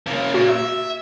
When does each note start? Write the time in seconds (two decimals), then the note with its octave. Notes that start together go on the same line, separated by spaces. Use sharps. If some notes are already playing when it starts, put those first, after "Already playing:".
0.07 C#3 A#3
0.34 A#2 F#4
0.48 E5